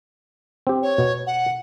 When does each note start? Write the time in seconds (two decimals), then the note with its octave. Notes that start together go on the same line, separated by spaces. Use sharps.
0.67 C4 G4
0.83 C#5
0.98 B2 B3
1.27 F#5